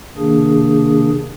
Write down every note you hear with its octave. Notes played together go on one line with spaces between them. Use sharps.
C3 D#3 A#3 D4 G#4